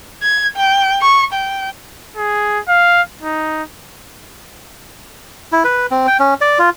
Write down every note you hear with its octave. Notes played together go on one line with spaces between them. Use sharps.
G#6
G5
C#6
G5
G#4
F5
D#4
E4
B4
C4
G5
C#4
D5
F4